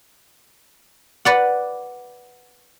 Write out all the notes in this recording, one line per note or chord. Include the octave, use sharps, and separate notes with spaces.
B4 D5 F#5